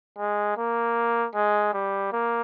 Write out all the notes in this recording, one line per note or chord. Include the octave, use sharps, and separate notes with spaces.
G#3
A#3
G#3
G3
A#3